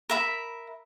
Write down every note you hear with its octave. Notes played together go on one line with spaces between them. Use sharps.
A#4 E5 B5